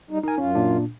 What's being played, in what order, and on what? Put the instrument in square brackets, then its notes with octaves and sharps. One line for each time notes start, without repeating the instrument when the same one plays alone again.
[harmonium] G3 D#4
[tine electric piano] D#4 G#5 [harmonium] A#4
[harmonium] F#2 F4 [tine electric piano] C#4
[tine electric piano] A#2 D4